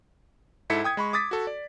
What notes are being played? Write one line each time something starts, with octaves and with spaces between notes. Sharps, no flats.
G#2 E4 A4 B6 C#7
G5 D#6 G#6
G#3 B5 C#6
D6 D#6 A6 B6
F#4 A4
D5